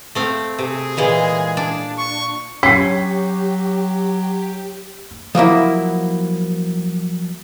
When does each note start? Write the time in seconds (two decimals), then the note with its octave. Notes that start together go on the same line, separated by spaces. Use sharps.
0.15 A3 C4 F5
0.59 C3 G#4
0.97 A#2 E3 G#3
1.57 D4
1.98 C#6
2.63 F#3 C#4 G4 B6 C7
5.35 F3 F#3 A#3 E4